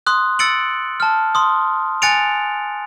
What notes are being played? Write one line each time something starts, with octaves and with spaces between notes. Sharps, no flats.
C6 D#6 F#6
E6 A6 C#7 D7 F#7
A5 F6
C6 D#6
G#5 F#6 A6 C#7 D7 F7